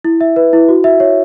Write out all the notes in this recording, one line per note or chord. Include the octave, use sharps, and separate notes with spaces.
E4
E5
B4
E4
F#4
E5
C#5